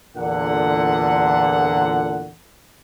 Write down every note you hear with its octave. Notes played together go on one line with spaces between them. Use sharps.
E2 A#2 D3 F#5